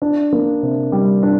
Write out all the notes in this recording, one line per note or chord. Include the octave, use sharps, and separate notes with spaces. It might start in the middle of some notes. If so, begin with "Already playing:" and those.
D4
A#3
C3
G3
D4